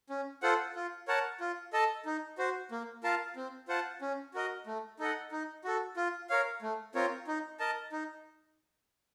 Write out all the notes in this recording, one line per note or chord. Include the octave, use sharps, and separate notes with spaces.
C#4
F4 A4 C5 F#5
F4
A#4 C#5 F#5 A5
F4
A4 D#5 A5
D#4
F#4 C5
A#3
F4 A#4 F5 A5
C4
F4 C5 F#5 A5
C#4
F#4 A#4 D#5
A3
D#4 A4 D#5 F#5
D#4
F#4 A4
F4
A#4 C#5 F5
A3
C4 F4 A#4 C#5
D#4
A#4 D#5 A5
D#4